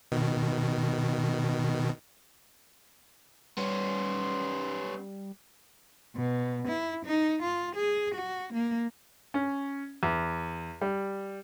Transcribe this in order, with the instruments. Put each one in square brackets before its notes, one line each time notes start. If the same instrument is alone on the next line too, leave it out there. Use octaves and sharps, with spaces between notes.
[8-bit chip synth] B2 D#3
[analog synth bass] G3 [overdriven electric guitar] B3 C#4 [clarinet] C6
[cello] B2
E4
D#4
F4
G#4
F#4
A#3
[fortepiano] C#4
E2
G3